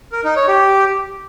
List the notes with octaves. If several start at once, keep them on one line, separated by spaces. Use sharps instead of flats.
A#4
D#4
C#5
G4